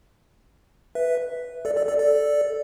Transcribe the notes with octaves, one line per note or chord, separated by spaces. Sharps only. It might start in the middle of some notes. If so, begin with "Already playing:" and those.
B4 E5
A4 D5
A4 D5
A4 D5
A4 D5